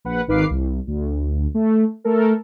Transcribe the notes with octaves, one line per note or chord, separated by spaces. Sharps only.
A#1 B4 F#5
G#1 D#3 B4 F5 D6 C7
C2
D2
A3
A3 A4 A#4